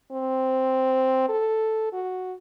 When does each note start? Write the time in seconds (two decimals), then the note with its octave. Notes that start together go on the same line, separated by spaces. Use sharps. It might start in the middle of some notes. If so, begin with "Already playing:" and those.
0.12 C4
1.29 A4
1.93 F#4